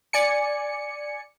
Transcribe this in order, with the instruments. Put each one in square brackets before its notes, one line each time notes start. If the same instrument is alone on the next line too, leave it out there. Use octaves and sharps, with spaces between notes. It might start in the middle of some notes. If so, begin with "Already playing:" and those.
[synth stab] D5 G#5 C#7